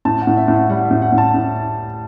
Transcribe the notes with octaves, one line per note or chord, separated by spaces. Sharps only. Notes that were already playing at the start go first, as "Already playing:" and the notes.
A2 A5
F#5
A2
E5
A2
F#5
G3 F#5
E5
A2
F#5
A2
A5
A2